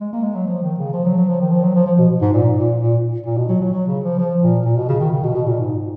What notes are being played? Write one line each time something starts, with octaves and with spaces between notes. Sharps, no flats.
G#3
A#3
G#3
F#3
F3
D#3
C#3
F3
F#3
F#3
F3
D#3
F3
F#3
F3
F3
B2
G#2
A#2
A#2
A#2
A#2
B2
F#3
F#3
F#3
C#3
F3
F3
A#2
A#2
B2
C#3
D#3
C#3
B2
B2
A#2
G#2